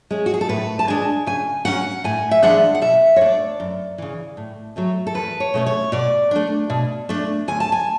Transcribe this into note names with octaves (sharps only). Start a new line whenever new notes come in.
G#3 C#4
F#4
G#4
A4
A2 B4
A5
G#3 D4 G#5
C#3 G#5
F#3 C#4 F#5
A2 G#5
E5
E3 G#3 D4 F#5
F#5
B2 E5
C#5
A3 D4 D5
F#2
C#3 E3
A2
F#3 A3 C#4
A4
E2 B4
C#5
B2 A3 C#4
C#5
B2 D5
A3 D4
B2
A3 D4
D2 G#5
A5
G#5